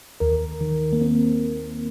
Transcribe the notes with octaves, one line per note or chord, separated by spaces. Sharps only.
D#2 A#4
D#3
A#3
C4